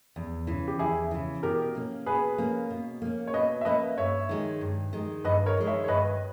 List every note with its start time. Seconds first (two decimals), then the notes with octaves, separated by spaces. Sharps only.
0.16 E2
0.47 C#3 E3
0.68 G4
0.79 E2 E4 G#4
1.11 C#3 E3
1.43 B2 G4 A#4
1.75 A#3 C#4
2.06 B2 G#4 B4
2.38 A#3 C#4
2.70 B2
3.02 A#3 C#4
3.28 C#5
3.34 B2 B4 D#5
3.61 E5
3.65 A#3 C#4 B4 D#5
3.98 G2 C#5 E5
4.29 D#3 G#3
4.61 G2
4.93 D#3 G#3
5.24 G2 B4 D#5
5.46 A#4 C#5
5.57 D#3 G#3
5.67 C#5 E5
5.84 C#5
5.88 G2 B4 D#5